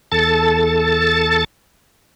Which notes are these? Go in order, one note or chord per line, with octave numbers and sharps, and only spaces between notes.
E2 A4 A5 A6